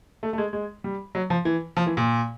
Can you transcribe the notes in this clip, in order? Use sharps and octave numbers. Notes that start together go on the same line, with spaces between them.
A3
A3
G#3
G#3
G3
F#3
F3
E3
F3
E3
A#2